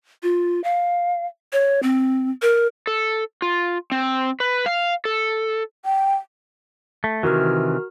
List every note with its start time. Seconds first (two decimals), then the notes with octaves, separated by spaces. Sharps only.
0.23 F4
0.64 F5
1.53 C#5
1.83 C4
2.42 A#4
2.87 A4
3.42 F4
3.92 C4
4.40 B4
4.66 F5
5.05 A4
5.85 G5
7.04 A3
7.23 C3 D#3 E3 F#4 A#4 F6